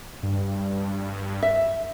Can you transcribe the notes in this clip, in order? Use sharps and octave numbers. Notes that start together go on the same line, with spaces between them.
G2
E5